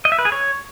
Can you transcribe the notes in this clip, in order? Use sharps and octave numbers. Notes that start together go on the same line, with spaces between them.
D#5
E5
B4
G#4
C#5